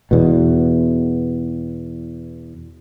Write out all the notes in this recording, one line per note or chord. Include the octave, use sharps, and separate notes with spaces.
E2 B2